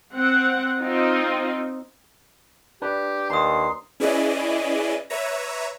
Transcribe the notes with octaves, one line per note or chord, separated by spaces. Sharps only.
C4 F#5
C4 D#4 F4
D4 G4 B4
D#2 A#5 C6 D#6
C#4 E4 G#4 B4 D5 D#5
B4 C#5 E5 A#5